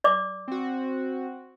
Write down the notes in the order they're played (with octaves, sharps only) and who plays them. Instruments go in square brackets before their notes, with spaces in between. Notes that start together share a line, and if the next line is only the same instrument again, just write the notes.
[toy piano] D5 D6
[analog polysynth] C4 F#4